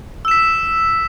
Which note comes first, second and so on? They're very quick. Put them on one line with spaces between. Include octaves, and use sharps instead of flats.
E6 E7 B6